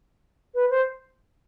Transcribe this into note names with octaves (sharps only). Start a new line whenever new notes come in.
B4
C5